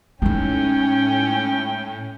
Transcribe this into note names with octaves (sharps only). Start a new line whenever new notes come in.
A2 G#3 C#4 D#4 G5